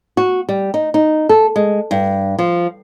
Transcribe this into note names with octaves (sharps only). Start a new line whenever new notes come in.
F#4
G3
D#4
D#4
A4
G#3
G2
F3